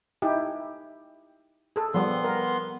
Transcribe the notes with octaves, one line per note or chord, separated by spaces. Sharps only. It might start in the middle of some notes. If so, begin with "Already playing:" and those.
D#4 E4 G4
G#4 A4
F3 G3 B3 C6
A#4